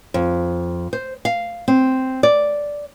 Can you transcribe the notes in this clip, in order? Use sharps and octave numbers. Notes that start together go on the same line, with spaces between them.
F2
C5
F5
C4
D5